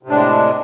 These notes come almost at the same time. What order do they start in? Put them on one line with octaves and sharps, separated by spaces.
C3 A2 D4 G#3